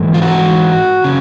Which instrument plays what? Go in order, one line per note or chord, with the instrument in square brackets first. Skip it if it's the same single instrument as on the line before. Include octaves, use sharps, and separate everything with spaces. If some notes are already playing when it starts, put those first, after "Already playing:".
Already playing: [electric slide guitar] G#2 E3
F4
F#4
C#3